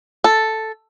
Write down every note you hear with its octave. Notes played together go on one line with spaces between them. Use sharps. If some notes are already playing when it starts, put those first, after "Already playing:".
A4